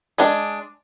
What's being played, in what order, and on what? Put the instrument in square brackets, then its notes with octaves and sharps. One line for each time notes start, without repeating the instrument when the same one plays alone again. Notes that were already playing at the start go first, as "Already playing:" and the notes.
[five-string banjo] G#3 D4